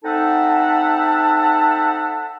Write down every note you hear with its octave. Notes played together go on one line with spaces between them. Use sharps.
C4 D#4 A4 E5 F#5 A5